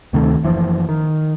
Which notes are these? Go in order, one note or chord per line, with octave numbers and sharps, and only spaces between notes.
D2 C3 D#3 A3
F#1 E3 F3
D#3